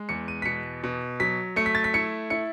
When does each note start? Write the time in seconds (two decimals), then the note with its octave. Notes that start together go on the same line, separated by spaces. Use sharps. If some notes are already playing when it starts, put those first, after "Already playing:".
Already playing: G#3
0.09 E2 C#7
0.28 D#7
0.42 B6
0.45 B2 C#7
0.84 B2
1.20 F#3 B6
1.56 A3 C#7
1.66 B6
1.75 A6
1.84 B6
1.94 E4 C#7
2.30 E4 C#7